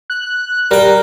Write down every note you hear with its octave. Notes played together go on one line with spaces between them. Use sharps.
F#6
G3 A#4 G5